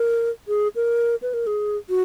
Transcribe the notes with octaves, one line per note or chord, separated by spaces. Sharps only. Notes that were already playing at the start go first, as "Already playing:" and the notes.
Already playing: A#4
G#4
A#4
B4
A#4
G#4
F#4